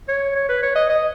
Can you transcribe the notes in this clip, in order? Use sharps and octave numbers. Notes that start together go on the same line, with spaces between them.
C#5
C#5
B4
C#5
D#5
D#5